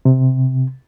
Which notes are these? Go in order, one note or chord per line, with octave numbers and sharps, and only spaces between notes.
C3